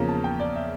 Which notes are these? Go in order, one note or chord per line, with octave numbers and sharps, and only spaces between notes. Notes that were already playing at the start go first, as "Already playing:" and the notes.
Already playing: E2 C#3 F3 A#3 C#4 A#5
A5
G5
D5
E5